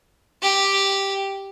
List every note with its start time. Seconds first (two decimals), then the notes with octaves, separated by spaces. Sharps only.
0.42 G4